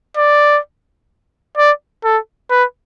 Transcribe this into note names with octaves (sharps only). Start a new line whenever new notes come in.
D5
D5
A4
B4